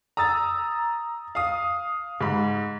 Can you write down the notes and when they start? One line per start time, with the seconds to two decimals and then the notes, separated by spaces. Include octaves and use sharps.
0.17 A#5 D#6 E6 A6
1.35 F5 D#6
2.21 G#2 B5